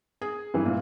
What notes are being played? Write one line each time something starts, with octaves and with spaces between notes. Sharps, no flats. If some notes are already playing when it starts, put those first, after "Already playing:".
G#4
G2 E3
A#2